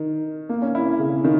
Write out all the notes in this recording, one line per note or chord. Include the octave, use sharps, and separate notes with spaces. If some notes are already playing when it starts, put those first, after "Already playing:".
Already playing: D#3
A#3
C#4
E4
C#3
D#3